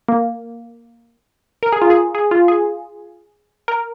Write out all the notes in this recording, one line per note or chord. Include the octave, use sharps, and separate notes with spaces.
A#3
A#4
G#4
F4
G#4
G#4
F4
G#4
A#4